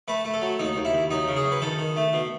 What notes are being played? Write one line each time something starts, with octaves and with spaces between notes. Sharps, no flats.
A3 B4
A3
A4
F#3
D#2 D#4
D#2
E4
D#2
F#2 D#4
C#3
G#4
F#2
B4
D#3 A4
D#3
A3
B2